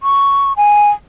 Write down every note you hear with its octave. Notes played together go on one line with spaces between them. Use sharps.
C#6
G#5